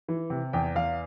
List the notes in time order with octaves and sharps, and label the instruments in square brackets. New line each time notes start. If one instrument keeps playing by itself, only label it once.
[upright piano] E3
C3
E2 G5
E2 F5